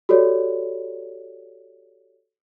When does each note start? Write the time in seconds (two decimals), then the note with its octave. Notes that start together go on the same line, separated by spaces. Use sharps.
0.09 F#4 G4 A4 C#5 D5